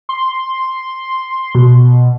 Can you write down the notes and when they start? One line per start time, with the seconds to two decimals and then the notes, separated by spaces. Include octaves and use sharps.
0.09 C6
1.55 B2